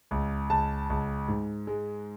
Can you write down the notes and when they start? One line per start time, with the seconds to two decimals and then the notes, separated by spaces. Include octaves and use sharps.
0.11 C#2
0.50 C#2 A5
0.90 C#2
1.28 G#2
1.67 G#3